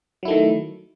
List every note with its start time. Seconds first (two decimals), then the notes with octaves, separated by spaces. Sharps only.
0.23 F#3
0.25 E4
0.28 A3
0.31 D#3